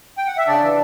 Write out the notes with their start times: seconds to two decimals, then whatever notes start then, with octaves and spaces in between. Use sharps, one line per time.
0.18 G5
0.27 F#5
0.37 E5
0.47 C#3 D4 D5
0.62 E3